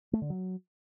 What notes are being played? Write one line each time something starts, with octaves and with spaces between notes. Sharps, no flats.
A3
D3
F#3